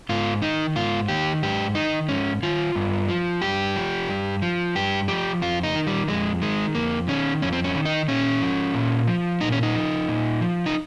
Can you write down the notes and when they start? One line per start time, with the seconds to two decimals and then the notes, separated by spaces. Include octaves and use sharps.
0.09 G#2 F4
0.42 D#3 D#4
0.76 G#2 F4
1.08 D#3 G4
1.43 G#2 G4
1.75 D#3 D#4
2.09 G#2 C#4
2.43 D#3 F4
2.76 G2
3.09 F3
3.42 G2 G4
3.76 F3
4.08 G2
4.42 F3
4.75 G2 G4
5.08 F3 G4
5.41 F2 F4
5.63 D#4
5.76 D#3
5.87 G3
6.08 F2 G#3
6.42 D#3 G#3
6.75 F2 A#3
7.08 D#3 C#4
7.42 F2 C#4
7.53 C4
7.64 C#4
7.75 D#3
7.85 D#4
8.08 A#2 C#4
8.42 F3
8.74 A#2
9.08 F3
9.41 A#2 D#4
9.52 C#4
9.63 D#4
9.75 F3
10.08 A#2
10.41 F3
10.66 D#4